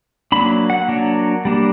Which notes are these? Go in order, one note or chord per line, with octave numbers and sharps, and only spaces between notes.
F#3 A#3 D4 B5
F#5
F#3 A#3 D4
G3 A#3 D4